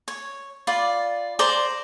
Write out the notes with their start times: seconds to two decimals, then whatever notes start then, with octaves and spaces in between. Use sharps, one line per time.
0.08 C#5
0.67 F4 D5 B5
1.39 C5 D5 A#5